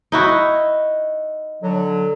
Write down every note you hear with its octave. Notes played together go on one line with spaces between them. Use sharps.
D#4 E4 F#4
D3 F#3